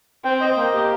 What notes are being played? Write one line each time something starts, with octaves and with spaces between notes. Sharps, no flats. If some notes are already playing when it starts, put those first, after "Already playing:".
C4 G5
D#5
A#3
G4